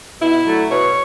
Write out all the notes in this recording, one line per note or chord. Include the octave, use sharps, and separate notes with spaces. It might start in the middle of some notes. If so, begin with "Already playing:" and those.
B2 E4
F#3 A3 D4
B2 C#5